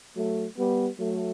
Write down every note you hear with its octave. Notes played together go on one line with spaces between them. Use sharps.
F#3 A3
G3 B3
F#3 A3